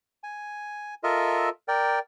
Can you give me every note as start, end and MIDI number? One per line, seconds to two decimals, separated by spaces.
0.23 0.94 80
1.04 1.49 65
1.04 1.49 69
1.04 1.49 70
1.04 1.49 75
1.04 1.49 76
1.68 1.99 70
1.68 1.99 74
1.68 1.99 79